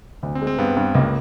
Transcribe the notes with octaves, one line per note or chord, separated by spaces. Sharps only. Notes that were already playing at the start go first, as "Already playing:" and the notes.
D2
C4
G#3
C4
G2 B3
G2
C#2 A#3